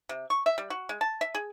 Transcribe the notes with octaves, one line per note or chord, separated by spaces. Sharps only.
C3
C#6
E5
G3
F#4
G#3
A5
E5
G#4